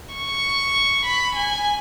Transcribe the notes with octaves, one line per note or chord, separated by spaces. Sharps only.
C#6
B5
G#5